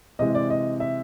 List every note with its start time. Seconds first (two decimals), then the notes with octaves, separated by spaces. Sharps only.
0.19 C3 E3 G#3 D#5
0.35 D5
0.50 D#5
0.80 E5